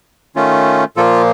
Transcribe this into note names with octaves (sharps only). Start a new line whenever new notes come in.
D#3 A3 C#4 F4
A#2 F3 A#3 F4 A4